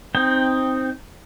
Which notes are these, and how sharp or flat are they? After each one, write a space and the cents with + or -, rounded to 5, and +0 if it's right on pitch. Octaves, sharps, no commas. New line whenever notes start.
C4 +0 D#4 +0 G5 +10